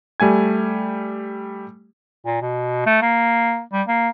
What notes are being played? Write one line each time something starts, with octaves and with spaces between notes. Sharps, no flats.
G3 A3 G#5 G#6
A#2
B2
A3
A#3
G3
A#3